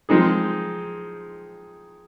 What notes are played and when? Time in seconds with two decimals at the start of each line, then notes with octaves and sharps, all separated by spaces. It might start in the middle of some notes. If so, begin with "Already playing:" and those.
0.09 F3 G#3 C4 D#4 G#4